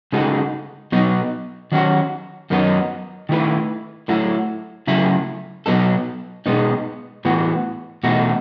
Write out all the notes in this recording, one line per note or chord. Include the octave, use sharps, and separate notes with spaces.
C#3 G#3 D#4 F#4 A4
B2 F#3 B3 D#4
D#3 F#3 C#4 F#4
F#2 D#3 F#3 B3 D#4
D#3 A3 E4 B4
A2 F#3 A3 E4
C#3 F#3 A3 E4
B2 F#3 B3 D#4 A4
B2 G#3 B3 D#4
A2 E3 B3 F#4
E2 B2 A3 D#4 F#4